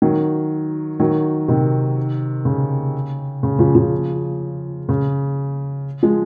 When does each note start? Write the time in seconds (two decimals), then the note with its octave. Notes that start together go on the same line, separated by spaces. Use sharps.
0.02 D#3 F#3
1.00 D#3 F#3
1.48 C3 D#3
2.45 C#3
3.43 C#3
3.59 C#3 F3
3.75 C#3 F3
4.89 C#3
6.03 F3 G#3